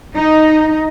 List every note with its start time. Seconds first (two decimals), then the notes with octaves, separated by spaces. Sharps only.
0.15 D#4